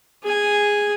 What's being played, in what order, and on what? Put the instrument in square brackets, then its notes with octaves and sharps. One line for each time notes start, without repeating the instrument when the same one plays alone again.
[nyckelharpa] G#4 G#5